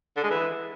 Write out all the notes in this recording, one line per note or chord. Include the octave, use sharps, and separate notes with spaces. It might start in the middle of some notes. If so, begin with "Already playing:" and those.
D3
G#3
E3